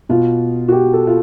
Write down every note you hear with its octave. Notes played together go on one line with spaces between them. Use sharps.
B2 F4
F#4
G4
A4
F4